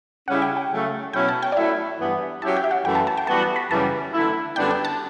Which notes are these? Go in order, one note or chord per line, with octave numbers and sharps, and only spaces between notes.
C#3 G3 C#4 E4 F#5
G5
G5
C#3 F#3 A3
B2 F#3 C#4 E4 G5
A5
G5
D5
F#3 A3 E4 E5
G2 E3 B3
F#3 C#4 E4 G4 A5
G5
E5
F#5
F#2 E3 A3 G5
A5
A5
G5
E3 G3 B3 F#4 A5
A5
B5
F#2 C#3 E3 G3 A5
D3 A3 E4
F#2 D3 G3 B3 D4 G5
G5
A5